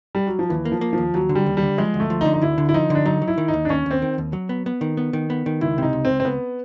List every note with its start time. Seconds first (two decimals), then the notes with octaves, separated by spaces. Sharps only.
0.15 G3
0.27 F#3
0.39 F3
0.49 D#2 E3
0.65 A#3
0.72 F3
0.81 A#3
0.93 D#2 F3
1.14 D#2 F#3
1.29 D3
1.35 G3
1.46 D#2
1.57 G3
1.62 D3
1.78 F3 G#3
1.94 D2
2.00 A3
2.10 F3
2.21 D#4
2.25 D3
2.34 D#4
2.42 D2 E4
2.58 D3
2.69 E4
2.74 F3 D#4
2.90 D3 D4
3.06 F#3 D#4
3.22 F#3
3.28 E4
3.38 D#3
3.48 D#4
3.53 D#2
3.65 D4
3.69 D#2 C#4
3.86 D#2 C4
4.02 D#3
4.18 D#2
4.33 F#3
4.49 B3
4.66 B3
4.81 D#3
4.97 B3
5.13 D#3
5.30 B3
5.46 D#3
5.61 C#2 E4
5.78 C3 D#4
5.93 C#2
6.05 C#2 C4
6.20 C4
6.25 C#2 B3